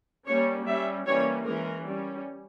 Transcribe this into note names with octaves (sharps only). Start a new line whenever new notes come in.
G3 A#3 C#4 C#5
G3 C#4 E5
E3 G3 A#3 C#4 C#5
E3 G#3 C#4 A#4
G3 C#4